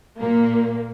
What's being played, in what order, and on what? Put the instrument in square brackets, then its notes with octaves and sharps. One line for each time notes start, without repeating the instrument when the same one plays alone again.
[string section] A#2 A#3